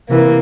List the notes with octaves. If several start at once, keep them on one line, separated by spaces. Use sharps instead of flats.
C3 E3 A#3